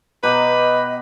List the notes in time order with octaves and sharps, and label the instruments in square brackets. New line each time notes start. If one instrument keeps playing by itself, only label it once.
[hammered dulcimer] B2 G4 A#5 [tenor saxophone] B4 [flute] D#5